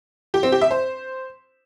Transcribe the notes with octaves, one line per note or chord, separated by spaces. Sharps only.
G4
C4
G4
E5
C5